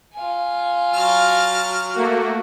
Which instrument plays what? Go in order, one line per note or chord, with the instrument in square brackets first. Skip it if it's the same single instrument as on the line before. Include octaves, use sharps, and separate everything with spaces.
[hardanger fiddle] F4 G#5
[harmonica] F#3 A5 F6
[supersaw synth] A3 A#3 F#4